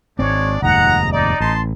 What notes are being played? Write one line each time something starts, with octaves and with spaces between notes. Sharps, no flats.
G#1 G#3 C4 D4 C#5 D5
F1 D#2 G#2 D#5 F#5 A#5
D#4 D5
A1 A5 C6